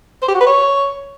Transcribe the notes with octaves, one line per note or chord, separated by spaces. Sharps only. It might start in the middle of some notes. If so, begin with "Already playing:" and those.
C5
G4
F#4
B4
C#5